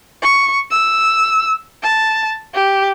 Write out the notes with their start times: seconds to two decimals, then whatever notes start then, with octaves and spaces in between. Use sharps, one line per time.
0.22 C#6
0.71 E6
1.83 A5
2.54 G4